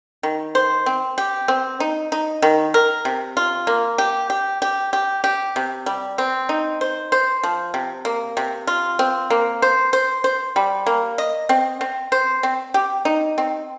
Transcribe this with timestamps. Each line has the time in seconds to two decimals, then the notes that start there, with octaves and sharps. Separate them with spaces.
0.23 D#3
0.55 C5
0.86 C4
1.18 G4
1.48 C4
1.80 D#4
2.12 D#4
2.42 D#3
2.74 A#4
3.05 C3
3.37 F4
3.67 A#3
3.98 G4
4.30 G4
4.62 G4
4.93 G4
5.24 G4
5.56 C3
5.86 G3
6.18 C4
6.49 D#4
6.81 C5
7.12 C5
7.44 F3
7.74 C3
8.05 A#3
8.37 C3
8.67 F4
8.99 C4
9.30 A#3
9.62 C5
9.93 C5
10.24 C5
10.56 G3
10.86 A#3
11.18 D#5
11.49 C4
11.81 C4
12.12 C5
12.43 C4
12.74 G4
13.05 D#4
13.38 C4